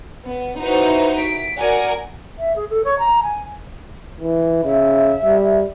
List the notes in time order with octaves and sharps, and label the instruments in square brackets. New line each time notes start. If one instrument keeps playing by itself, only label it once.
[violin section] B3
D#4 E4 F#4 B4 C5
B6 D7
F#4 A#4 D5 F#5 G#5
[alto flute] E5
G#4
A4
C#5
A#5
G#5
[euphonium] E3
[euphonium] C#3 [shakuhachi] E5
[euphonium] G3